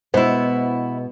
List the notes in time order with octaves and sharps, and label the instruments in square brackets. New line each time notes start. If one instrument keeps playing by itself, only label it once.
[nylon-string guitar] B2 G#3 [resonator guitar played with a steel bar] B3 E4 [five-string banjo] C5